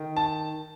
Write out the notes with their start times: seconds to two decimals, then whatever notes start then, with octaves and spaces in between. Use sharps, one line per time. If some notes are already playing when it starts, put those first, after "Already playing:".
Already playing: D#3
0.17 A5